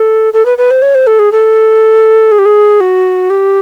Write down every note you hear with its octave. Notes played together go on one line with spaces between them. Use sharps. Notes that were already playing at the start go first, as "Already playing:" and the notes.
Already playing: A4
A4
B4
B4
C5
C#5
C5
A4
G#4
A4
G#4
G4
G#4
F#4
G4